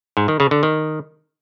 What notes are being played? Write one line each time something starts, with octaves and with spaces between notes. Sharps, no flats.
G#2
D#3
C#3
D3
D#3